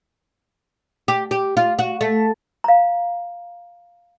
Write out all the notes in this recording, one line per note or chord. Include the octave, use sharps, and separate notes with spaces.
G4
G4
F4
F#4
A3
F5 A#5